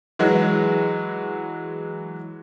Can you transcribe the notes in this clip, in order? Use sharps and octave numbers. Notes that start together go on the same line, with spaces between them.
E3 F#3 G#3 F#4